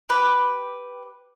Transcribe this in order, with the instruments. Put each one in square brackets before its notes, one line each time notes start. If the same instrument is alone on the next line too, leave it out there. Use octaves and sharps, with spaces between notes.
[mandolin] G4 B4